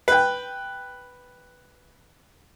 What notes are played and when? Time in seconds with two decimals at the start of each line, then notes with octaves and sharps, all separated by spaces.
0.08 B4 G5